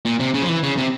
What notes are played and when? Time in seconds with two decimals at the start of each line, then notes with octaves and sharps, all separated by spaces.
0.05 A#2
0.20 C3
0.34 C#3
0.42 F3
0.49 E3
0.63 C#3
0.77 C3